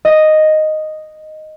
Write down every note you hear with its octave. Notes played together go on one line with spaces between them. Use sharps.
D#5